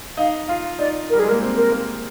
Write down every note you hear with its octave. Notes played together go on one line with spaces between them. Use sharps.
D#4 F5
F4 F5
D#4 D5
G3 A#4
G#3 G#4
A#3 A#4
C4
A#4
A#3